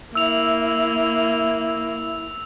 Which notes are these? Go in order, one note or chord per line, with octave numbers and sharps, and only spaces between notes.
A#3 E4 E5 E6 F7